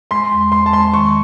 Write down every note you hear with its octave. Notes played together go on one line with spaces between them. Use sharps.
G#3 C6
E2
G#3 C6
A5
G#3 C6
D#3 C#6